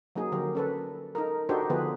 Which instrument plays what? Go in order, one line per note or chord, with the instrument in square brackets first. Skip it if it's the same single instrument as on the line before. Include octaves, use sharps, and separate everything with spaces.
[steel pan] F#3 A#3 D#4 G#4
D3 F3 F#3 G4 A#4
C#4 A4 B4
D#4 A4 A#4
D4 D#4 F#4 G4 A4 C5
D3 F3 B3 F4 G#4 B4